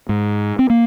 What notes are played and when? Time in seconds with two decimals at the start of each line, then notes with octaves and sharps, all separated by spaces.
0.09 G#2
0.59 C4
0.70 A#3